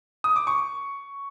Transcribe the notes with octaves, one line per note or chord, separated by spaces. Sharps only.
D#6
D6
C#6